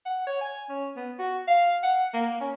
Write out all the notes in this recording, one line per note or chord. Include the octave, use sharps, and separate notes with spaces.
F#5
C#5
G#5
C#4
B3
F#4
F5
F#5
A#3
C#4